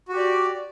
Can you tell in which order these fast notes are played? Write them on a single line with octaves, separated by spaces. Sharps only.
F#4 G4 D5